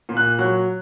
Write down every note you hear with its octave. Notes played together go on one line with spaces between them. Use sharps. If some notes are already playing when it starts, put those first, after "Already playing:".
A#2
F#6
F#3 F#6